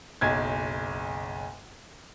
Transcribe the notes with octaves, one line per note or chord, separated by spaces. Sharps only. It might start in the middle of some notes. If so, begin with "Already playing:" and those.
F#1 B1 G#6